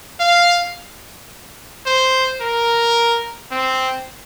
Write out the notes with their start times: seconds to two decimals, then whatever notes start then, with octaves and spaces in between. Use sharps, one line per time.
0.20 F5
1.86 C5
2.41 A#4
3.51 C4